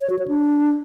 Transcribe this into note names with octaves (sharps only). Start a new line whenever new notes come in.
C#5
F#4
C#5
D4